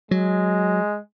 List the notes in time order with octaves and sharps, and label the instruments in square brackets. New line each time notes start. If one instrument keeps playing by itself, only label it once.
[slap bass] F#3 [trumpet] G#3